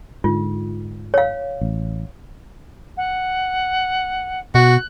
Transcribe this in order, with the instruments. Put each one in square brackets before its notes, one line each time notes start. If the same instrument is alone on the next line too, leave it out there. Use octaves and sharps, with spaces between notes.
[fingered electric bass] G#2 D3 [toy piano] F4
[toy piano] C#5 F5
[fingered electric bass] A1
[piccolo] F#5
[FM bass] B2 [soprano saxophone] F#4 [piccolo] F#6